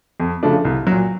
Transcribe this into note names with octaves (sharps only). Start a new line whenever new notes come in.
F2
C#3 F3 A3 D4
C2
A#2 F#3